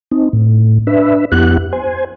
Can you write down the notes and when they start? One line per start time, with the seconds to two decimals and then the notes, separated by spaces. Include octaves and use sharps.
0.11 C4 D#4
0.33 A2
0.87 D4 B4 E5
1.32 F2 B3 E4 G4 F#5 F#6
1.73 C5 G#5